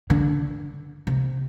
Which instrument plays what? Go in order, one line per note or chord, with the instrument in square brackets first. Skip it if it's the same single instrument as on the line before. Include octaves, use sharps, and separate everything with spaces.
[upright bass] D3
C3